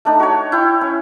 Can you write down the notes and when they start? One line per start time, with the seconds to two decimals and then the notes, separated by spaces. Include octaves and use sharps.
0.05 A3 D4 D#4
0.20 F#4 A#4 C#5
0.52 E4 F#5 G5
0.81 C#4